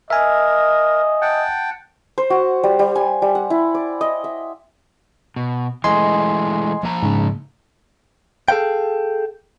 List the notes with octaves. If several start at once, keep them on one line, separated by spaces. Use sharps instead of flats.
A#4 D#5 E5 G#5
F#5 G5 A5
C5
F#4
G3
G3
G#5
G3
F#5
E4
D5
D#5
E5
B2
E3 G#3 A3 D#5 G#5 C6
F3 A#3 A#5
G#2 C#3
G#4 A4 C5 F5 G5